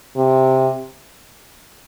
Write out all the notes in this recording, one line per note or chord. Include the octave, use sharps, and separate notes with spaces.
C3